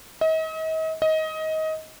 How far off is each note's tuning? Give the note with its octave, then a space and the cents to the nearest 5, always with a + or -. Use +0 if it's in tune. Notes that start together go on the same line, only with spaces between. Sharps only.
D#5 +40
D#5 +20